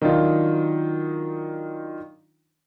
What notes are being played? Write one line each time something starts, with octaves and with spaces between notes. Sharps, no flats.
D#3 F#3 D4 D#4 F4